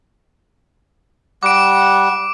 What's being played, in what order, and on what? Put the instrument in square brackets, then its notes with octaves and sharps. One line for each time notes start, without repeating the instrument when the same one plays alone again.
[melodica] G3 F#5 [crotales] D6 D7